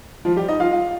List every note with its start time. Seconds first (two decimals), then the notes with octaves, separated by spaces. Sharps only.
0.25 F3 F4
0.36 G3 G4
0.48 D#4 D#5
0.60 F4 F5
0.71 F4 F5